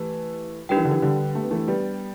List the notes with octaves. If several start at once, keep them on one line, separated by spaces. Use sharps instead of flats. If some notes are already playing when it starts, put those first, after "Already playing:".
Already playing: E3 A3 G4
G3 D4 G4 B4 G5
E3
D3
E3
D3 G3
A3
B3
E3 A3
G3 B3